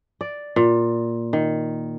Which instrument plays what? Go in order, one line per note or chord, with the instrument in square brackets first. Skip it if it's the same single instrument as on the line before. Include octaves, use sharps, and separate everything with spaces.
[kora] D5
A#2
D#3